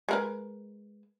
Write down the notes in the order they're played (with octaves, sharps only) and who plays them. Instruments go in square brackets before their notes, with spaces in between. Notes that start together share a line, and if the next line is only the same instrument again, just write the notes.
[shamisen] G#3 A#4 B4